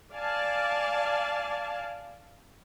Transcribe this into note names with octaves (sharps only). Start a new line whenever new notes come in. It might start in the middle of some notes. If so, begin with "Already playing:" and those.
D5 F5 G#5 A5